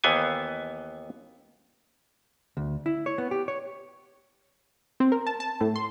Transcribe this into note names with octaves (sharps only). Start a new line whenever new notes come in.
D#2 E3 B3 C5 G#5
D2
E4
C#5
B3
G4
C#5
C4
A#4
A5
A5
A2
C6